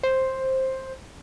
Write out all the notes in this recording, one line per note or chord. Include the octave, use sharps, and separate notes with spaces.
C5